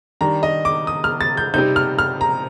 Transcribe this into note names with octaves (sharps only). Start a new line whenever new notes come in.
D#3 G3 D4 A#5
D#5
D6
D#6
F6
A6
G6
C3 G3 C4 D#4 G6
F6
F6
A#5